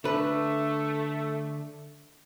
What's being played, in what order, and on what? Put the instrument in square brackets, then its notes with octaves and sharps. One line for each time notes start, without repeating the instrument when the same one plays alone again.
[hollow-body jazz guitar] D3 B4 [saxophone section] A3